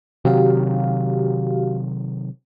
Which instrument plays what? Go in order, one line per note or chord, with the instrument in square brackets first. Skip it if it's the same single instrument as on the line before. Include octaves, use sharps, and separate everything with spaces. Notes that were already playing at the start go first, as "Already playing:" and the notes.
[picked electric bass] C3 D#3 F#3 [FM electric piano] F#4 G4 F5